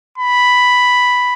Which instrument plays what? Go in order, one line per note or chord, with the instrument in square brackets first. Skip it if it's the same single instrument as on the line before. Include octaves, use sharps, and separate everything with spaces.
[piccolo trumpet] B5